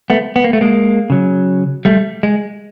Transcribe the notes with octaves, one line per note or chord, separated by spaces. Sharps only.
A3 B3
B3
A#3
A3
G#3 A#3
C#3 F#3
G3 A3
G#3